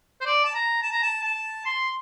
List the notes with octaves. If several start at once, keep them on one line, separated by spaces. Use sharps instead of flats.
C5
D5
A5
A#5
A5
A#5
A5
A5
C6